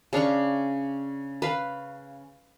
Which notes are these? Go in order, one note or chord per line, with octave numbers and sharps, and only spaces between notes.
C#3 D4 F5 C#6
B4 F5